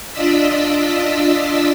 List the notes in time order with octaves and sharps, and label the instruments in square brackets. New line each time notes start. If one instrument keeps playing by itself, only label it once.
[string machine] D4 F4 D5 D#5 E6 B6